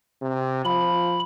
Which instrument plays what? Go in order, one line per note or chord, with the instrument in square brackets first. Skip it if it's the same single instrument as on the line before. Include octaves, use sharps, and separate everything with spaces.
[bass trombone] C3
[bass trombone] F3 [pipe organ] B5